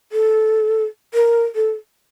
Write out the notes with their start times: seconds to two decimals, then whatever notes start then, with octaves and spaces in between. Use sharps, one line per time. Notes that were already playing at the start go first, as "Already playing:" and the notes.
0.12 A4
1.14 A#4
1.55 A4